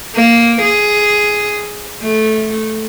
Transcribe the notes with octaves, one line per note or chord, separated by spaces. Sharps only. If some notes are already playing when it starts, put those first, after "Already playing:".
A#3
G#4
A3